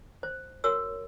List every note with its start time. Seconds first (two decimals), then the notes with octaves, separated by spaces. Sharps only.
0.23 C5
0.64 F#4 A#4 C#5 E6